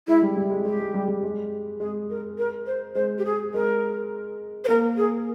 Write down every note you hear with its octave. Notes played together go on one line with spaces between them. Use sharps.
G#3 E4
G3
G3
G#3
G#3 G4
G#3
G3
G3
G#3
G#3 G#4
A#4
A#4
C5
G#3 C5
G4
G#4
G#3 A#4
C5
A#3 A#4
G#4